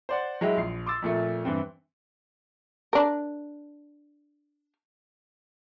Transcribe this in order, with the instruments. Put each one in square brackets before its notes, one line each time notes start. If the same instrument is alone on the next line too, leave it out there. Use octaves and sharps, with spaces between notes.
[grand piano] C5 D5 F#5
F#3 G#3 E4 G4
A#1 C7
C6 D6 E6 A6
F2 A#2 A3
G2 E3 C4
[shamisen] D4 A#4